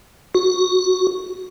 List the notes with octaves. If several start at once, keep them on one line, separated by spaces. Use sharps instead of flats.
F#4